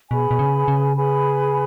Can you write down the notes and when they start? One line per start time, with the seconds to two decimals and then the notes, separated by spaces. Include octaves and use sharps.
0.11 B2 G#4 B4 G#5 B5
0.31 B2
0.39 C#3
0.68 C#3
0.96 G#4 B4 G#5 B5